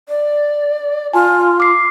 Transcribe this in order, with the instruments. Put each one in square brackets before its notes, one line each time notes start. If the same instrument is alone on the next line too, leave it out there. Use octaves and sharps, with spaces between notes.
[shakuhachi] D5
[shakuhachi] F4 [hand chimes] G#5 A5
[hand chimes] D6 C7